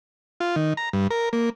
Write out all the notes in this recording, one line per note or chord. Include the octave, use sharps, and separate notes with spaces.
F4
D#3
A#5
G2
A#4
A#3